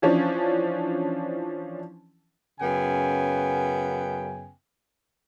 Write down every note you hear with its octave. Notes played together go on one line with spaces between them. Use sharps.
E3 F3 C#4 D4
F#2 C#3 B3 G5 G#5